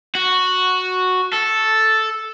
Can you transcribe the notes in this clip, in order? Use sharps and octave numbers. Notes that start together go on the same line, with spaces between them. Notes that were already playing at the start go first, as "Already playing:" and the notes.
F#4
A4